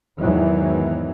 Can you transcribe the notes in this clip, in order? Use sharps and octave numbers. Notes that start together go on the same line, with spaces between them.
E2 G#2 D#3 E3 F#3